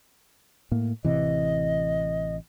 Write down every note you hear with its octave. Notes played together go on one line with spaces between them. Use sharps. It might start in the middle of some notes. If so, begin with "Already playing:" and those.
A2 A#3
A1 C3 E3 D#5